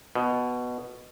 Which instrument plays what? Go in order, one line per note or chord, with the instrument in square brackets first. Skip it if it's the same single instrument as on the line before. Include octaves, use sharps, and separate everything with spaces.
[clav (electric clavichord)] B2